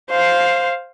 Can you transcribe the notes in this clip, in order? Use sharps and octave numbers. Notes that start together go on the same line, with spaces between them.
C5 F5